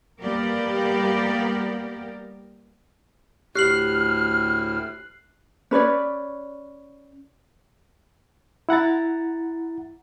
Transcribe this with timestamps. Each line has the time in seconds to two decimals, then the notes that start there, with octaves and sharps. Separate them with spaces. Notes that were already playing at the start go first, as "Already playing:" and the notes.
0.20 G3 A#3 B3 G4 A#4 D5
3.55 D2 A2 G4 F6 F#6 C7 F#7
5.71 C#4 B4 C#5 D5
8.69 E4 F#5 A#5 A6